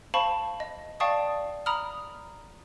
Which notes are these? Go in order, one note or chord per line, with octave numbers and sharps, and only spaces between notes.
C5 F5 A5 B5 C#6
D#5
D5 F5 G5 A5 C#6 D#6
A#5 B5 D#6 F6